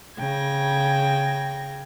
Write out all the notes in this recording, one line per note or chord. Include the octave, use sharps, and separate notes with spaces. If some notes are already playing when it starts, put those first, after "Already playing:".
C#3 G5 G#6 A#6